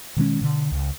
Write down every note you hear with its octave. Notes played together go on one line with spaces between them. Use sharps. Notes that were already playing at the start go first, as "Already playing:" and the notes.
B2 D#3 G#3 C#4
B2 D3
C#2